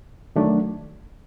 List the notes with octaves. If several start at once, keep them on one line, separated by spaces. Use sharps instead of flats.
D#3 F#3 A3 D4